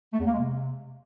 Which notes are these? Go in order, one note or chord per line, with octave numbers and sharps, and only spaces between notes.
A3
E2
A#3
G#3
C3